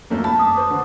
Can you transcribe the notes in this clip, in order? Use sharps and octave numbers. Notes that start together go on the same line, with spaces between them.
F#2 A3 A#3
A5 B5
D6 D#6
B4 C5
D3